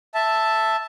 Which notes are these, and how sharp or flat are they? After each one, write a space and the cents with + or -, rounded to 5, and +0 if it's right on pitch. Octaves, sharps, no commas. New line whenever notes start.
E5 +0 A5 +0